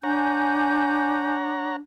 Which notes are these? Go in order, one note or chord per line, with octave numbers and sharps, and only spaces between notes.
D4 C#5 F#5 G#5 A#5 G6